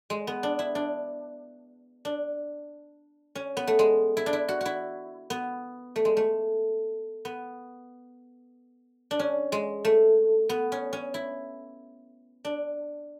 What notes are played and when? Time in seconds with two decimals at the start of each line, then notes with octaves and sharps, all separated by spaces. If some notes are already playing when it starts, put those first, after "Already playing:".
0.10 G#3
0.27 B3
0.43 D4
0.59 E4
0.75 D4
2.05 D4
3.35 C#4
3.57 B3
3.67 A3
3.79 G#3
4.17 E4
4.26 D4
4.33 E4
4.49 F#4
4.61 E4 F#4
5.30 B3
5.96 A3
6.05 G#3
6.17 A3
7.25 B3
9.11 D4
9.19 C#4
9.52 G#3
9.85 A3
10.49 B3
10.72 C#4
10.93 C#4
11.14 E4
12.45 D4